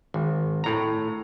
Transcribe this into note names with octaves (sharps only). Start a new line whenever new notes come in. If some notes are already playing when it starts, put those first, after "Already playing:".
G#1
A2 A#5